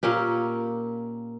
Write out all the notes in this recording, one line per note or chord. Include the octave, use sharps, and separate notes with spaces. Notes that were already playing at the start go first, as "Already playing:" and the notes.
A#2 A#3 C#4 G4